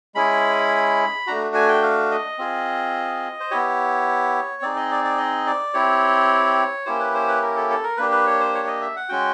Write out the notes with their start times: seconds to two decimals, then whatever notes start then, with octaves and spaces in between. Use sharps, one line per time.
0.15 G#3 C#4 E4 G#4 B5
1.27 A3 D4 F#4 A#5
1.55 G#5
1.68 G5
1.82 F5
2.11 D#5
2.38 C4 F4 G#4
3.40 C5
3.51 B3 E4 G4 C#5
4.62 C4 D#4 G#4 D5
4.77 D#5
4.91 D5
5.04 D5
5.18 D#5
5.47 D5
5.74 C4 E4 G4 C#5
6.86 A#3 C#4 E4 G4 C5
7.00 B4
7.14 C5
7.28 B4
7.42 A#4
7.56 A4
7.70 A4
7.84 A#4
7.97 A#3 D4 G4 B4
8.11 B4
8.26 C#5
8.40 C5
8.54 C#5
8.67 D#5
8.81 E5
8.96 F#5
9.09 G#3 C#4 F#4 G5